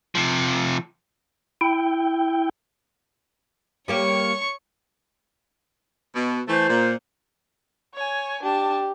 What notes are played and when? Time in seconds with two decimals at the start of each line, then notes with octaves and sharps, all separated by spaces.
0.15 C3 F3
1.61 E4 G5
3.88 G3 A#3 G4 C#5 C#6
6.16 B2
6.48 E3 A3 C5
6.70 A#2
7.95 C#5 G#5
8.43 D4 G4 A5